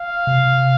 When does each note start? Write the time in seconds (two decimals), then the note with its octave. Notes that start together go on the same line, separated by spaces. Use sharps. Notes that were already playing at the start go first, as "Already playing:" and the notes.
Already playing: F5
0.27 C3